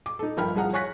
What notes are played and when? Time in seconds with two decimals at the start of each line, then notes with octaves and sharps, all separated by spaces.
0.06 D6
0.19 D#4 A4
0.37 G1 F3 A#4 G5 B5 F6
0.55 C2 F3 G#4 F#5 A#5
0.73 C#5 G#5 C#6 F#6 A#6 B6